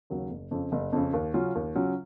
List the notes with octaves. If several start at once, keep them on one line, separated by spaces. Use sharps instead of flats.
D#2 C#3 F#3 C#4
F#1
F2 C#3
F#1
F2 C#3
D#2
C#3 F#3 C#4 F4
D#2
C#3 F#3 C#4 F4